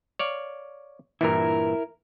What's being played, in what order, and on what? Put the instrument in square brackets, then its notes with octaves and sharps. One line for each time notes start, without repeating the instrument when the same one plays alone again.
[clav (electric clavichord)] C#5 D5 F5
[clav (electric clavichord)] G2 A#2 E3 [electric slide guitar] E4 A#4